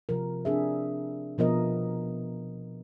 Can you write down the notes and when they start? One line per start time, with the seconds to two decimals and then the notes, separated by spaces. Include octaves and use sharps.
0.09 C3 F3 A#4
0.45 C4 D4 G#4 E5
1.38 B2 F3 B3 A#4 D#5